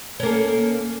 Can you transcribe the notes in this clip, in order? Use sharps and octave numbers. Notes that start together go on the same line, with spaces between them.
A#3 C#4 A4